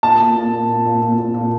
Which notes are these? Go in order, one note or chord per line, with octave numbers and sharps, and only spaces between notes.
A#2 A5
A#2
A#2
A#2
A#2
A#2
A#2
A#2
A#2